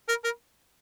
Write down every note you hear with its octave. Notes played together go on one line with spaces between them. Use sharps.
A#4
A#4